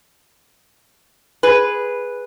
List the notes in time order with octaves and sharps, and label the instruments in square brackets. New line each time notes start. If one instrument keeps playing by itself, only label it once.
[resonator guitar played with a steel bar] G#4 B4